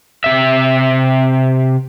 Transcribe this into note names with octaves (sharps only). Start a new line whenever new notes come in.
C3 E5